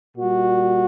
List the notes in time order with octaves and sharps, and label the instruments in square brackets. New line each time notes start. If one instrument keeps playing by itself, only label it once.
[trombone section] A#2 G3 F#4